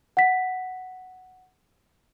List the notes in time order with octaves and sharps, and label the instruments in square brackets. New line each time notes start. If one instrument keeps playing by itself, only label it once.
[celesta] F#5 B6